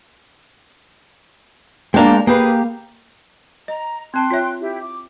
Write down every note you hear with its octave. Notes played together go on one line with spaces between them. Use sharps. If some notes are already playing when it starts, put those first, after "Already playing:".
G#3 A#3 D4 G5 A#5
A#3 G4 G#4 B4 F5
D#5 A#5
C4 G5 A5 C6 F#6
F4 C#5 E5
E4 G4
D6